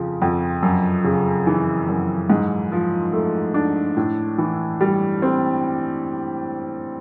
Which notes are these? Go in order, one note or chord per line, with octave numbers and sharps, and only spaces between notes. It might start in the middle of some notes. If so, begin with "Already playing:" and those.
Already playing: F2 C#3 F3
F2
F#2
C#3
E3
F#2
G#2
F3
A3
D4
A2
E3
G3
C4